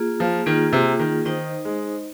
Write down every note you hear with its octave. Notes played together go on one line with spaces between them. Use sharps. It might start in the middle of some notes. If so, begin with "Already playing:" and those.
Already playing: A#3 F4 G#4
F3
D#3 A#3 F4 G#4
C3
D#3
D#3 D#4 C5 D#5
G#3